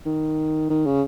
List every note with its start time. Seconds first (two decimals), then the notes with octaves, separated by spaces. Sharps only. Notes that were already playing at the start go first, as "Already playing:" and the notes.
0.06 D#3
0.70 D#3
0.86 C#3